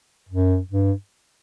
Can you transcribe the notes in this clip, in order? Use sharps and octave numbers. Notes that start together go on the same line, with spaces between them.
F#2
G2